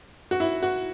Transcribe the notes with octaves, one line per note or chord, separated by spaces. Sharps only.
F#4
E4
F#4